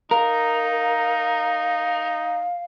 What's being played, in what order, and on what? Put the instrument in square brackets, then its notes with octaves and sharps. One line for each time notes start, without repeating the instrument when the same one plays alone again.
[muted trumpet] D#4 [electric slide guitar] A#4 [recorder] F5